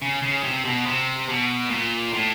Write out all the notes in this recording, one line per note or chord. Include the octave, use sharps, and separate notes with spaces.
C#3
C#3
C3
B2
C3
B2
A#2
A2